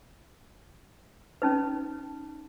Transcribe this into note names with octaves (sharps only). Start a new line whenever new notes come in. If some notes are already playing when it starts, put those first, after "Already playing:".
C#4 D#4 B4